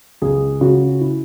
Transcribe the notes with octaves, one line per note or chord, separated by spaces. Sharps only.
C#2 G#4
C#3 F#4
E4